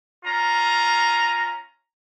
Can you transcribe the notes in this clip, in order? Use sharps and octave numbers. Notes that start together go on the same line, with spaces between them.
C#4 F4 A#5